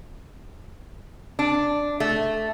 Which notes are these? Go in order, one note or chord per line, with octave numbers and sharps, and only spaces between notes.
D4
A3